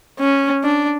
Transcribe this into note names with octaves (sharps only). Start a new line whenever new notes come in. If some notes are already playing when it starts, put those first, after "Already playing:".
C#4
D4